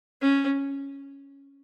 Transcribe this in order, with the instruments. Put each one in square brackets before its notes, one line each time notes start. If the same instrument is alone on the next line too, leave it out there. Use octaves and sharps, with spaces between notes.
[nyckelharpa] C#4